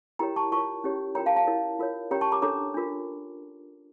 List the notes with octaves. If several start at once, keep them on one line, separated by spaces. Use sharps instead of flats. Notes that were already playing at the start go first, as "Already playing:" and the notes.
E4 G4 A#4 C#5 G5 A#5
A5 C#6
F4 A#4 C#5 A5 C#6
C#4 E4 G4 C#5
F4 A#4 C#5 G5 A#5
F5 A5
F5 A5
E4 A#4 C#5
F4 A#4 C#5
C#4 G4 A#4 C#5 G5 A#5
A5 C#6
A#5 D6
D4 A4 C#5 A#5 D6
D4 F4 A#4